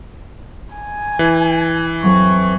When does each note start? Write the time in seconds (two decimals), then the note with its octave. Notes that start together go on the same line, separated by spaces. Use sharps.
0.75 G#5
1.19 E3
2.04 F2 F#3 C#6